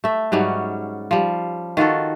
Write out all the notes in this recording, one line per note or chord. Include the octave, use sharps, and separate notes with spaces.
A3 E5
G#2 F#3 G3 C#4
F3 G3
D#3 F4 F#4 A4